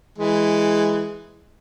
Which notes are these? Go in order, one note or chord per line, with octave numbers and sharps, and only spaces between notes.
E3 G#3